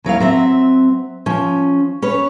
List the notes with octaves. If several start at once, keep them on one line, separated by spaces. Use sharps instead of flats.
D#2 F#3 E4 F5
F#3 C4 E5
F3 C#4
C#4 B4 C#5